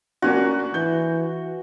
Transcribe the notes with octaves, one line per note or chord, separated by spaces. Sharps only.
A#3 C#4 D4 F#4
E3 G6